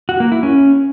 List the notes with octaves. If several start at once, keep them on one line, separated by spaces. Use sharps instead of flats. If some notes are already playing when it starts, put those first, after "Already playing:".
F#4
A#3
E4
C#4